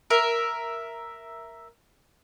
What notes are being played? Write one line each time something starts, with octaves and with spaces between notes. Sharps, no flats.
A#4 E5